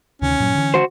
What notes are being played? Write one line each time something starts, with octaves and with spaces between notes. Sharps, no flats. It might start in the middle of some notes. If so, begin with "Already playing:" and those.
D2 C3 D#3 C#4
G2 A#2 F#3
D3 E3
F#4 C5